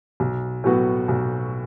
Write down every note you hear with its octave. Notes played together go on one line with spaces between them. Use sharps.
B1
A2 F#3 B3 F#4
B1